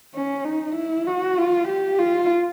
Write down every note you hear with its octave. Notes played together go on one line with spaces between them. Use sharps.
C#4
D#4
E4
F#4
F4
G4
F4